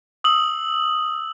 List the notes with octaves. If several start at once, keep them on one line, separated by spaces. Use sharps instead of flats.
D#6 E6 F#7